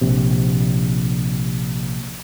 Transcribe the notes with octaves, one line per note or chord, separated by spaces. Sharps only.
A#1 C3